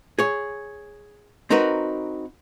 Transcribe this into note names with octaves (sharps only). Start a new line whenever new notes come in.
G#4 C#5
C4 D#4 F#4 A#4 B4